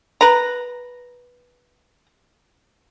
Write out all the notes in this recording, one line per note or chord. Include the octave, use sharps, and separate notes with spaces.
B4 A#5